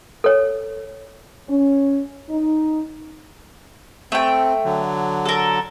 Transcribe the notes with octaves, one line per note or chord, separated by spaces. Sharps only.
A4 C#5
C#4
D#4
A3 C4 G5
D3 F#3
A4 A#4